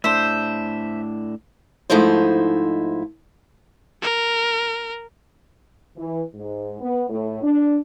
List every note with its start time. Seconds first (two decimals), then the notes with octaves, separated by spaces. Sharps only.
0.04 A2 D4 C5 E5
1.90 G#2 F3 A3 D#4 E4 C5
4.02 A#4
5.97 E3
6.35 G#2
6.80 B3
7.10 A2
7.43 D4